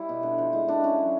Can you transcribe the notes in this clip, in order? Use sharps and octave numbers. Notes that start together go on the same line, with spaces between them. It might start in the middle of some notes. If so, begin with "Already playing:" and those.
Already playing: G3 E4
B2
D3
F3
G#3 E4
D3 D4
D3 C#4
F#3